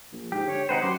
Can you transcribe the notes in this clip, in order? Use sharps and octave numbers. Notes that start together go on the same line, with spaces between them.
A#1
G#2 G4
D3 C#5
G#1 D#4 B4 C5 F#5 G5
F#2 F#5 C6 D6